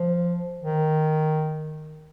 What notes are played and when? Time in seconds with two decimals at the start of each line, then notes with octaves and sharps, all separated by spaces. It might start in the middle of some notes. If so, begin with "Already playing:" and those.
Already playing: F3
0.62 D#3